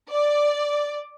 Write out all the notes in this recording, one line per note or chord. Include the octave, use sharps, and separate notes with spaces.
D5